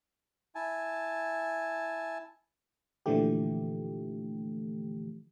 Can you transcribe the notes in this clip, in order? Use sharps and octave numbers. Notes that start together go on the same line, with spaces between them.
E4 G#5 A5
A#2 D3 E3 F3 A3 G4